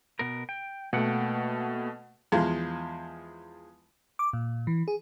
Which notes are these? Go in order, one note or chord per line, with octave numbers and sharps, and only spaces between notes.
B2 B3 A#4
G5
B2 A3 A#3 F#5 G5
E2 F3 G#3
D6
A#2
E3
G#4